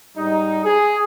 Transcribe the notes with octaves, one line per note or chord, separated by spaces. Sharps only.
G#2 G3 D#4
G#4